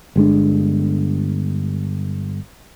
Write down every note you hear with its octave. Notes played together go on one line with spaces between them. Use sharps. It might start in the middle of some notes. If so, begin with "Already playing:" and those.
G1 G#3 D4